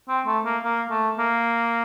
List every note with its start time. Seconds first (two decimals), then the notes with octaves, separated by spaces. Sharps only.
0.08 C4
0.26 A3
0.45 A#3
0.64 A#3
0.90 A3
1.18 A#3